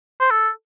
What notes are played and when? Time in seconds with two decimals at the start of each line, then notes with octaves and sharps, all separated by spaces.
0.20 C5
0.31 A4